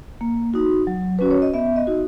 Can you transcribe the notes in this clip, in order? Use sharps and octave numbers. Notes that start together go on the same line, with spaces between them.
A#3
D#4 F#4
F#3
C#4 F#4 B4
C#5
D#5
B3 E5
D#5
D#4 F#4